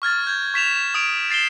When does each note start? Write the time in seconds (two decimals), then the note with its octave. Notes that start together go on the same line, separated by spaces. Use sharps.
0.02 C#6 F6 G#6 A6
0.27 G6 G#6
0.54 C#6 B6 E7 F7
0.94 D#6 D7 F7
1.30 A6 C7 E7 G7